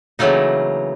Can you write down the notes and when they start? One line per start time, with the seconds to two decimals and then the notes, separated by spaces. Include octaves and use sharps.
0.19 C#3 E3 F#3 A3 A#3 D#4